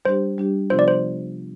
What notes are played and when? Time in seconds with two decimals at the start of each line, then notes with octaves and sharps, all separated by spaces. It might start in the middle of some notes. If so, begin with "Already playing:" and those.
0.05 G3 D4 G4 C5
0.38 G3 D4 G4
0.70 C3 F3 B3 D4 F4 C5
0.79 D5
0.88 C5